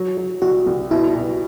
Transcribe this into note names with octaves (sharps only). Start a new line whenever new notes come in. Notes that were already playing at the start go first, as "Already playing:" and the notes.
Already playing: F#3
F#3
C2 F#4
C2
B2 E4
B2